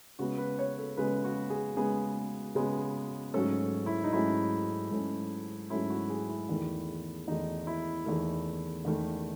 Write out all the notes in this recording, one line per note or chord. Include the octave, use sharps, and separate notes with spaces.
C#3 G#3 B3 F#4
B4
C#5
A4
C#3 G#3 B3 B4
F#4
G#4
C#3 G#3 B3 G#4
C#3 G#3 B3
G#2 F#3 A3 C#4 A4
E4
D#4
G#2 F#3 A3 C#4 E4
G#2 F#3 A3 C#4
G#2 F#3 A3 C#4 E4
F#4
G#4
E4
E2 D#3 A3
E2 D#3 A3 D#4
E4
E2 D#3 A3
E2 D#3 A3